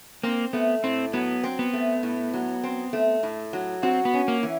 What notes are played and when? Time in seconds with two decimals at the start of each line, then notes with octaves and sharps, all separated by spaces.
0.23 A#3 C4
0.53 A3 B3
0.84 A2 C4
1.13 F#3 B3
1.44 C4
1.59 B3
1.73 A3
2.03 A2
2.34 F#3
2.63 C4
2.93 A3
3.23 A2
3.53 F#3
3.83 C4 F#4
4.05 B3
4.14 C#4
4.28 A#3
4.43 E3